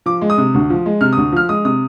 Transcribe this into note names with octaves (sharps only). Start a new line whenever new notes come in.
F3 D6
G#3
D#6
C3
D2
F3
G#3
C3 F6
D#6
D2
F3 F6
G#3 D#6
C3 D#6